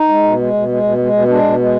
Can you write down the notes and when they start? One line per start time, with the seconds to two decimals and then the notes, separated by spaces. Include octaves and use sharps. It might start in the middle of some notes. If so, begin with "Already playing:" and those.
Already playing: D#4
0.09 G#3
0.23 B2
0.38 G#3
0.54 B2
0.68 G#3
0.83 B2
0.98 G#3
1.13 B2
1.28 G#3 D4
1.43 B2
1.58 G#3